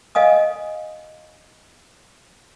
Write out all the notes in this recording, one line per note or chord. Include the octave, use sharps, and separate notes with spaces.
D#5 F5 G#5 D#6